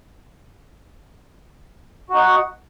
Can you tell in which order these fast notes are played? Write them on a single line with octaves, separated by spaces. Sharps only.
F#4 D#4 F#5